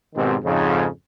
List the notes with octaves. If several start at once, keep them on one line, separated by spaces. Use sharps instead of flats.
G#1 G#2 B2 D#3 C4 G4
F2 G#2 C#3